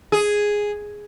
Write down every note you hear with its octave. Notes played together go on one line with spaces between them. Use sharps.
G#4